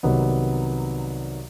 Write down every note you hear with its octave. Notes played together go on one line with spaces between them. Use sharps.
C2 C3 D#3 F#3 B3